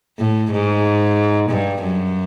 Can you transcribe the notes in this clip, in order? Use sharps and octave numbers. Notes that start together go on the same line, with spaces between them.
A2
G#2
G2
F#2